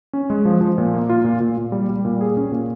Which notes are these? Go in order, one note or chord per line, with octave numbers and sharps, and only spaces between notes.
C#4
G#3
F3
F3
A#2
A#3
F4
A#2
A#2
A#2
G3
G3
A#2
G#4
C#4
A#2